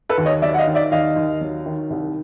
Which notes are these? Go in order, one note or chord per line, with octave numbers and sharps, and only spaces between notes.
A4 B4
D#2
C#5 D#5
F#3 D5 E5
F#5
D#5 F5
D#3
D5 E5
D#2 D#5 F5
D#2
F#3
D#3
C2